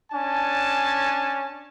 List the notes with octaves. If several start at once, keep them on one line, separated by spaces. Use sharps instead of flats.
C#4 D4 G#5 A5